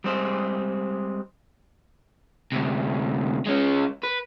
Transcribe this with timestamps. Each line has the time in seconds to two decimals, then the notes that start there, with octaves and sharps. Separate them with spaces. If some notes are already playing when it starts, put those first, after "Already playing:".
0.04 G3 G#3 C4 G#4 C5
2.52 D2 C3
3.46 G#3 C#4
4.04 B4